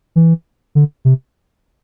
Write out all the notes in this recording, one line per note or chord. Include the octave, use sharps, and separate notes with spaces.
E3
D3
C3